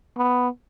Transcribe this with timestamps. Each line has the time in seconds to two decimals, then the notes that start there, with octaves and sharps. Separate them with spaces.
0.17 B3